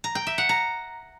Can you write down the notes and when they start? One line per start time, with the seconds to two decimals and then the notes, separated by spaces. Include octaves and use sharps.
0.04 A#5
0.15 G5
0.27 E5
0.38 F#5
0.49 A#5